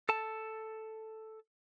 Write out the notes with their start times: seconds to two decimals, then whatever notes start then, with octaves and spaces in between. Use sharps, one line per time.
0.09 A4 A5